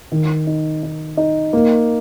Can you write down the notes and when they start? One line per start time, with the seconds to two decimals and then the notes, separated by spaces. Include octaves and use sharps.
0.12 D#3
0.47 D#4
0.83 D#4
1.17 D#4
1.53 A#3